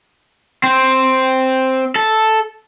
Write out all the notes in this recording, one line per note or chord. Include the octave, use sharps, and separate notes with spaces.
C4
A4